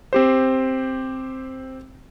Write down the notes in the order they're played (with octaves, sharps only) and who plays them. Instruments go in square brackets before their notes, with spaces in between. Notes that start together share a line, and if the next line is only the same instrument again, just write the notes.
[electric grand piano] C4 G4 C5